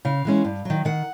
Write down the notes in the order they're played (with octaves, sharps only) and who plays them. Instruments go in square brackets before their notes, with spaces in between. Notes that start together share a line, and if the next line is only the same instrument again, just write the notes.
[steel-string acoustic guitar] C#3 F5
E3 G#3 C#4
G2
D#3 F#3
D#3 F#5